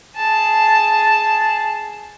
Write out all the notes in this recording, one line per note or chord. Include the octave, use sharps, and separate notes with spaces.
G#4 A5